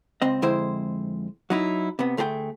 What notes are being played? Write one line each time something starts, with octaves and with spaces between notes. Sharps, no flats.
C#2 C4 D#5
F2 D3 G#3 E4 C5 G5
F#3 D#4 E4
C3 B3
D2 A3 G#4 A4 G5